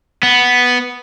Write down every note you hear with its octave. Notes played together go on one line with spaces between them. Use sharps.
B3